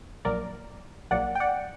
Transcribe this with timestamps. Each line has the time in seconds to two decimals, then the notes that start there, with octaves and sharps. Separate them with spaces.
0.25 A#1 A#2 F#3 A#3 A#4 D5
1.11 A#1 A#2 F#3 A#3 D5 F#5
1.35 G5
1.40 D5 F#5